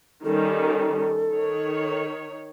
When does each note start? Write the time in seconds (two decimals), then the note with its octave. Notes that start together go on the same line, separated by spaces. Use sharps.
0.25 D#3 G3 C#4 A4
1.32 D#3 C#5